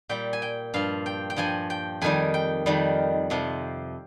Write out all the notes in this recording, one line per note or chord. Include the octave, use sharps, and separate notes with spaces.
A#2 G3 G5
G#5
G5
G2 F3 F5
G5
G5
G2 F3 G#5
G5
F2 D#3 G3 G#5
G5
F2 D#3 G3
F2 C3 F3